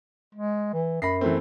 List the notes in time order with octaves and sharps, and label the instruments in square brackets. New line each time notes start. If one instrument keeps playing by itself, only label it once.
[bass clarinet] G#3
E3
[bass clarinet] F#2 [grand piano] B5 A#6 C7
[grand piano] E3 A3 C4